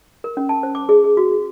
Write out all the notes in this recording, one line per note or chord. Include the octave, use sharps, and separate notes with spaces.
A#4
C#4
A5
C5
D6
G#4
G#4
F#4
G#4